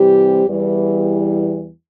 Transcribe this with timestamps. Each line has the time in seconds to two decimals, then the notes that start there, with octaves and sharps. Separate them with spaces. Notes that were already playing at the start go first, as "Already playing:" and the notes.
Already playing: C3 E3 G3 C4 G4
0.45 E2 E3 G3